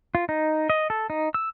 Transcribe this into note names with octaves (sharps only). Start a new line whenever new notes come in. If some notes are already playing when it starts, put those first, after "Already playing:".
F4
D#4
D#5
A4
D#4
E6